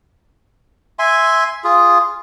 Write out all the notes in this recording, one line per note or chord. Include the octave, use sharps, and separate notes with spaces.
E5 G#5 C6
F4 G#4